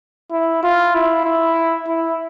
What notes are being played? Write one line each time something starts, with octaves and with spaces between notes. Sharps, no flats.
E4
F4
E4
E4
E4